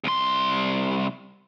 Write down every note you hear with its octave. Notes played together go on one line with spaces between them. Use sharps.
C2 C6